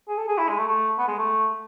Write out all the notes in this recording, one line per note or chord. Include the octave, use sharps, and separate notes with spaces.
G#4
A4
G#4
E4
G#3
A3
A3
B3
G#3
A3